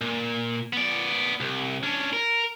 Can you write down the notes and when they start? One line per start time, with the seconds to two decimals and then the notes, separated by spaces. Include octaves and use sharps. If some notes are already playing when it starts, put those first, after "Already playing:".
0.01 A#2
0.73 B3 D5
1.40 C2
1.83 C#4 D4
2.13 A#4